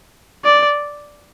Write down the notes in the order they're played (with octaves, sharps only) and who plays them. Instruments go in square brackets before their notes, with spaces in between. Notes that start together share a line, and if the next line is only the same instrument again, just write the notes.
[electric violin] D5